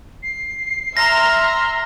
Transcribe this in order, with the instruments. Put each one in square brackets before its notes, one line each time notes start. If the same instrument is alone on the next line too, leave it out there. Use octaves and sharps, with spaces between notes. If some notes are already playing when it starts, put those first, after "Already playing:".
[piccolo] C7
[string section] E5 A#5 C6 [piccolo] F6 [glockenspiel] A#6